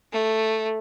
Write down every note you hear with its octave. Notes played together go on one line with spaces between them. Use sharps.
A3